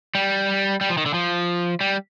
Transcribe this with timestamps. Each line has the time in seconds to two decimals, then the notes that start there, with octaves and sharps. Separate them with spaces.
0.15 G3
0.81 G3
0.90 F3
0.98 D#3
1.06 D3
1.14 F3
1.81 G3